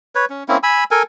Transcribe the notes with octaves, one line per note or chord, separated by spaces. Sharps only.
B4 C#5
C#4
A#3 C4 C#4 E4
G#5 B5 E6
A4 A#4 G#5